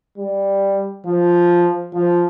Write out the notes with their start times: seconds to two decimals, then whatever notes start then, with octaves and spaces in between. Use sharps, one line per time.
0.18 G3
1.06 F3
1.94 F3